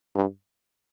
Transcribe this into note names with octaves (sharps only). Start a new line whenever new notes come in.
G2